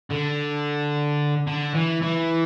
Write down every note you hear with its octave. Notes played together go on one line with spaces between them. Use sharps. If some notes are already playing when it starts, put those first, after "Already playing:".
D3
D3
E3
E3